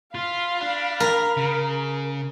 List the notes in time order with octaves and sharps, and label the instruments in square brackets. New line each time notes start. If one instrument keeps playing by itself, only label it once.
[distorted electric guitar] F4 [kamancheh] F5 B5
[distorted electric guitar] D4
[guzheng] A#4
[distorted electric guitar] C#3